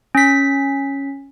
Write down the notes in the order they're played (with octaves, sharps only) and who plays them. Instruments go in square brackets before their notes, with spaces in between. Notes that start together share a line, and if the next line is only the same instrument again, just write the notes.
[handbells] C#4 B6